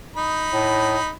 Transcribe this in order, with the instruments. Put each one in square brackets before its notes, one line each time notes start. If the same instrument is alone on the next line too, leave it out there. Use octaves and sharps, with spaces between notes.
[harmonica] D#4 B5
[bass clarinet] A2